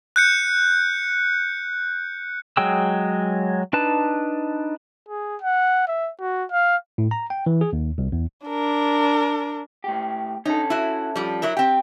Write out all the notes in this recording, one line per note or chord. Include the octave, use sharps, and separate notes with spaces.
F#6 G6 C#7
F#3 G#3 G#4 G5 E6
D4 D#4 B4 A5
G#4
F#5
E5
F#4
F5
A2
A#5
G5
E3
G#4
D#2
C2
E2
D4 A#4
A2 G4
C#4 D#4 A4
E4 F#4
F3 G3
F#3 E4 A#4
C4 G4 G5